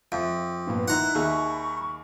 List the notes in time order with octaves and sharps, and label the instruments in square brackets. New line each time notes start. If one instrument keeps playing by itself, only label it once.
[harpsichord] F2 [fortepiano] E5
[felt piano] G2 A#2 B3
[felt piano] D#3 D#4 C6 [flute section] E4 F#6 [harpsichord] F#5 A#5
[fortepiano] D#2 G#4 E5 [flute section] B5 C#6